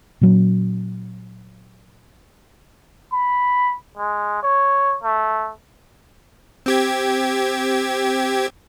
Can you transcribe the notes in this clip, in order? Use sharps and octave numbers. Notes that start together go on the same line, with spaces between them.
A#2 F#3 C#4
B5
G#3
C#5
A3
C4 G4 G#6